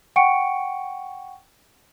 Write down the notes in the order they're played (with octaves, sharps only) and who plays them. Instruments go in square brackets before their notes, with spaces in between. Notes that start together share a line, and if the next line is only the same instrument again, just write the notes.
[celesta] F#5 G5 C#6 C#7 D7